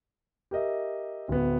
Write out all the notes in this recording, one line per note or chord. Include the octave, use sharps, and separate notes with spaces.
G4 A#4 D#5 E5
D1 B3